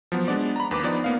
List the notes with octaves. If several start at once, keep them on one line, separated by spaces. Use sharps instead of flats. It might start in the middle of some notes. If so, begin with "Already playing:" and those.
F3 F#3 B3
G#3 B3 D4 D5
A#5 B5
D#2 B4 D6
F3 B3 D#4 D5
A#3 B3 F5